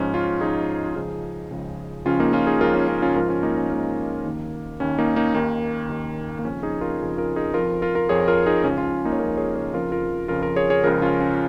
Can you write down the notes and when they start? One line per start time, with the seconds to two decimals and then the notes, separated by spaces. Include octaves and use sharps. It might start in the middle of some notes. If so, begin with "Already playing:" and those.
Already playing: G#2 F3 C#4
0.14 C#4 F4
0.41 G#2 F3 D#4 G#4
0.86 F4
0.96 C#2 C#3 F3 D#4 G#4
1.51 C#2 C#3 F3
2.05 C#2 C#3 F3 C#4 F4
2.20 A#3 D#4
2.33 C#4 F4
2.47 D#4 G#4
2.61 C#2 C#3 F3 F4 A#4
2.75 C#4
2.88 C#4 F4
3.02 C#4 F4
3.15 G#2 F3 F4 A#4
3.29 C#4 F4
3.43 A#3 D#4
3.57 C#4
3.70 G#2 F3 A#3
4.25 D#2 D#3
4.80 D#2 D#3 C#4
4.99 A#3 D#4
5.16 A#3 D#4
5.34 D#2 D#3 A#3
5.89 D#2 D#3
6.39 A#3
6.45 F2 C#3 F3 C#4
6.63 D#4 G#4
6.81 F4 A#4
7.00 F2 C#3 F3
7.17 F4 A#4
7.36 D#4 G#4
7.54 F2 F3 F4 A#4
7.82 F4 A#4
7.95 F4 A#4
8.09 F2 F3 G#4 C#5
8.28 F4 A#4
8.46 D#4 G#4
8.64 C#2 C#3 F3 C#4 F4
8.78 C#4 F4
9.05 A#3 D#4
9.12 C#5
9.19 C#2 C#3 F3 F4 A#4
9.37 G#4 C#5
9.55 G#4 C#5
9.74 F2 C#3 F3 F4 A#4
9.92 F4 A#4
10.28 F2 C#3 F3 F4 A#4
10.42 F4 A#4
10.56 G#4 C#5
10.70 G#4 C#5
10.84 C#2 C#3 F3 F4 A#4
11.02 C#4 F4
11.20 C#4